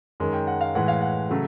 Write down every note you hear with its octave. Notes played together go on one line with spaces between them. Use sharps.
F#2 D#3 G#3
G5
F#5
F5
A2 E3 G#3 F#5
F5
F#5
C#3 F#3 A3